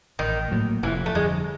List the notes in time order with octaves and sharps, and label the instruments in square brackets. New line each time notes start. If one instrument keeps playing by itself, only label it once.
[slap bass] A1 [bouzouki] D#3
[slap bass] A2 F#3 A#3
[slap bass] F1 [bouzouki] E3
[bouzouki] A3
[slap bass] F2 D3 G3 [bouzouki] G#3